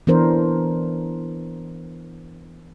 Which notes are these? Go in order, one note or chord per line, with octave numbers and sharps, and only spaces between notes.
E3 B3 D4 A#4 C5